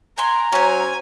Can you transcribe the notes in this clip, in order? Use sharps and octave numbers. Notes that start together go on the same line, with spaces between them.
F#5 G#5 A#5 C6
F#3 C#4 C5 G#5